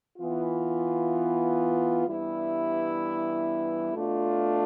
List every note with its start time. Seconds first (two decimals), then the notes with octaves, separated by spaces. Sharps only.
0.17 E3 B3 F4
2.06 G2 E3 G3 B3 E4
3.94 B2 A3 D4 F4